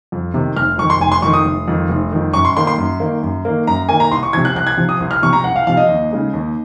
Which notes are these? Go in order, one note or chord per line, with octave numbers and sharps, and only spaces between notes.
F2
C3 D#3
F1 F6
F2 D#3 C#6
C6
F1 G#5
C6
F2 D#3 C#6
D#6
F1
F2 D#3
F1
F2 D#3
F#2 C#6
C6
D#3 A#3 C6
C6
F#2
D#3 A#3
F#2
D#3 A#3
F#2 A#5
D#3 A#3 G#5
A#5
C2 C6
C#6
C3 F3 G#6
F#6
C2 F#6
G#6
C3 F3
D#6
C2
F6
C3 F3 C#6
A#5
C2 F#5
F5
C3 F3 F5
D#5
D#2
C#3 G#3 D#4
D#2